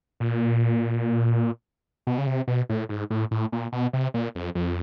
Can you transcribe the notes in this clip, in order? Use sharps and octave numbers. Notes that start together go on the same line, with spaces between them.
A#2
B2
C#3
C3
B2
A2
G#2
A2
A2
A#2
B2
C3
A#2
F2
F2